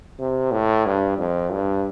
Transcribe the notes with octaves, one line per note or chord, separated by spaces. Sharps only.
C3
A2
G2
F2
G2